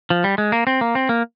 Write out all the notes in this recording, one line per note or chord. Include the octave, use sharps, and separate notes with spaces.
F3
G3
G#3
A#3
C4
A#3
C4
A#3